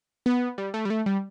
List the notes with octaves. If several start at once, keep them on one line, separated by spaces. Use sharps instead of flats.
B3
G3
A3
G3
A3
G3